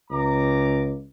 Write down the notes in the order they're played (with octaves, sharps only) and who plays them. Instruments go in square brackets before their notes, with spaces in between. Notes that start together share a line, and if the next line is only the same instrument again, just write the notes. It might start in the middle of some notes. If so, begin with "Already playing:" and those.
[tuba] C#2 [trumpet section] A#5 D6